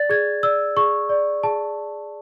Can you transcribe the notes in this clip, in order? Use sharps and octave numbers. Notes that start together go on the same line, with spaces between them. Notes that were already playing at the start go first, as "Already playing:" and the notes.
Already playing: D5 A6
G#4 G#6
D5 E6
G#4 C#6
D5
G#4 A5